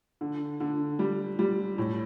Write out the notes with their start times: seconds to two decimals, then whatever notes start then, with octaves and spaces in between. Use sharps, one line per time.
0.21 D3
0.60 D3
0.99 G3
1.39 G3
1.78 A2